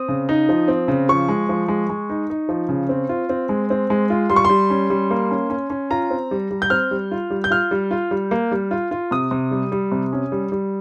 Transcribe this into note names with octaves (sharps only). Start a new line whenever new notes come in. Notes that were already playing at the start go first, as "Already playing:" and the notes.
Already playing: C4 D#6
C#3
D#4
F3
C4
C#3
F3 C#6
G#3
F3
G#3
G#3
D#4
D#4
F3
C#3
C4
F4
C4
G#3
C4
G#3
F4
G3 C6
C#6
G3 C6
C#4
G3
A#3
C#4
C#4
C#4
F4 A#5
C4
G3
G3
G6
C4 F6
G3
F4
G3
G6
F4 F6
G3
F4
G3
A#3
G3
F4
F4
C3 D#6
C3
G3
G3
C3
C#4
G3
G3